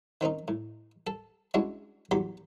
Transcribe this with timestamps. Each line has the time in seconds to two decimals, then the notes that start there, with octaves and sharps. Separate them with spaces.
0.21 D#3 C4 C#4 D#4
0.48 A2
1.07 A4 A5
1.54 G#3 C#4 D4 E4 F#4
2.11 E2 F#3 G4 B5 C6